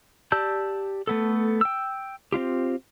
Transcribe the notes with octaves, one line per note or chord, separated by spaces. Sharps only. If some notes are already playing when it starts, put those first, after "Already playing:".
G4 D5 A5 E6 G6
A3 B3 A4
G5 E6
C4 D4 F4 G4